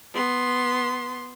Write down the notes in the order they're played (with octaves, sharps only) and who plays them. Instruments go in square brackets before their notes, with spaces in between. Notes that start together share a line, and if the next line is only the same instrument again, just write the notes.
[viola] B3 C6